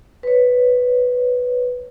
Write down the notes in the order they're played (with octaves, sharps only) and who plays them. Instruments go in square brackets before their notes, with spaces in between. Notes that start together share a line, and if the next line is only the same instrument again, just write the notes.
[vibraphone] B4 C#5